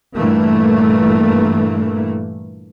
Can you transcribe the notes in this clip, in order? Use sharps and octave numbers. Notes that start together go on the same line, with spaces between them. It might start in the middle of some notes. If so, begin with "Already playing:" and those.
G2 A#2 E3 A3 A#3